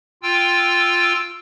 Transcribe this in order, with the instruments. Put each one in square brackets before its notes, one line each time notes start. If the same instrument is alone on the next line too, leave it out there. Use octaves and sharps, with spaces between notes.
[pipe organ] F4 G5 E6